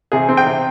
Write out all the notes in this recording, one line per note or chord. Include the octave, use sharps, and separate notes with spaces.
C3 G#4
C4
G5
C3